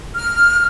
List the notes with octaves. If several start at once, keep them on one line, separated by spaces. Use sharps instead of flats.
F6